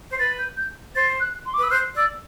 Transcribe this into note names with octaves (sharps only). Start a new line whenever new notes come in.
C5
B4 A6
G6
G6
C5 A6
F#6
C6
D6
B4
E6
C5 F#6
D5 E6